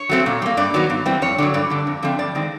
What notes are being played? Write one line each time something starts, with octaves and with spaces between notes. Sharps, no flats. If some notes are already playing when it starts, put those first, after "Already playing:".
Already playing: C#5
F#3 A3 C4
A#2
G3 A#3
G2 D5
D#3 F#3 B3
G2
E3 G3 C4
F2 C#5
D3 F#3 D5
G2 D5
D3 G3
F2
D3 F3 A3 C4
G2 D5
D#3 G#3 C4